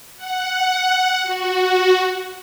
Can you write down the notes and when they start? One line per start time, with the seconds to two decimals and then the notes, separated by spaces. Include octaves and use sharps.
0.17 F#5
1.23 F#4